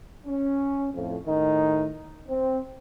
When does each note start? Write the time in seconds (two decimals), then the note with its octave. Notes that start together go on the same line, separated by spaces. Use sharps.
0.27 C#4
0.94 F2 A2 F3
1.26 A2 D#3 D#4
2.29 C4